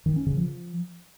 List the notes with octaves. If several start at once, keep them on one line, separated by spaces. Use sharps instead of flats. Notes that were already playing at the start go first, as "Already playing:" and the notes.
D#3
C#4
C#3
F3